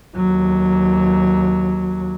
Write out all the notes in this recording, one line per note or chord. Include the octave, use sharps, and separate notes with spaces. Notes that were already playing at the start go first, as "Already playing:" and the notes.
D#2 F#3